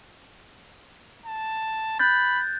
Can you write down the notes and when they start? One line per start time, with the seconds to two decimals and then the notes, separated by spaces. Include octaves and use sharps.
1.26 A5
1.99 B5 F#6 G6 A6